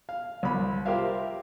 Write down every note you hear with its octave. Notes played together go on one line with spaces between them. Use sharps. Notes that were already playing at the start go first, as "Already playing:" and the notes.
F5
C2 B5
F4 G4 A#4 C5 E5 F5